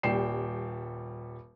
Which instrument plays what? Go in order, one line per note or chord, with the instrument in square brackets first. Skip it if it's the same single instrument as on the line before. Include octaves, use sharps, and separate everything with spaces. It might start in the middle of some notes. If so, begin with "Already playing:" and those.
[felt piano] D#1 G3 G5 C7 E7